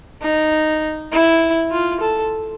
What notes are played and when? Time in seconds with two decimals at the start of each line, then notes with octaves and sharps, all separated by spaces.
0.21 D#4
1.11 E4
1.71 F4
2.00 A4